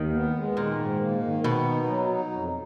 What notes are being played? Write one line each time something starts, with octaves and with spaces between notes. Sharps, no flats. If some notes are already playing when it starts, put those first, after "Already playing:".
Already playing: D#2 D#3
B3
G#3
A#2 D#3
G#2
A#3
D#3
B2 B3
D#4
F#3
D#4
F2